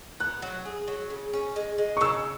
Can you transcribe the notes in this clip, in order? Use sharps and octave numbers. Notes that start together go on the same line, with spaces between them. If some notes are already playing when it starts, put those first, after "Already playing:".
B3 F#6
F#3
G#4
F#3
C#3
C#4
G#3
G#3
C#6
C#3 E6